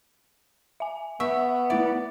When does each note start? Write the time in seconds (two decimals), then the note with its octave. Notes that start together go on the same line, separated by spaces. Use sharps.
0.80 E5 G#5
1.20 B3 E5 C#6
1.70 A3 E4 D5 E5